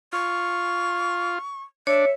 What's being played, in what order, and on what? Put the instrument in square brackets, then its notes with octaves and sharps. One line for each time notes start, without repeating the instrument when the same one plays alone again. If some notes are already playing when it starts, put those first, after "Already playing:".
[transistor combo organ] F4 [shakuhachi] C#6
[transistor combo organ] D4 [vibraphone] C#5 [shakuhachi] E5